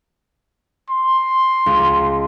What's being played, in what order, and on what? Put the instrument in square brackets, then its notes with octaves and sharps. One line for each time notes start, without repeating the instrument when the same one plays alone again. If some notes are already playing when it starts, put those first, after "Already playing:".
[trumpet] C6
[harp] C#2